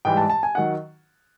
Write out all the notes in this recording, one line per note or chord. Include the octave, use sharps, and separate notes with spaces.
G#2 E3 G3 G5
A5
A5
G#5
D#3 F#3 F#5